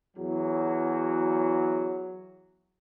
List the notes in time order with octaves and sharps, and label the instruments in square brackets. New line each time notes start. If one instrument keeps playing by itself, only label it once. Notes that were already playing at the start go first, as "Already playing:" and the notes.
[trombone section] E2 F#3